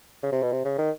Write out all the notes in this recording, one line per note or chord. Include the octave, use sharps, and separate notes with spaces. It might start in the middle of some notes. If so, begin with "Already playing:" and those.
C#3
C3
B2
C3
C#3
D#3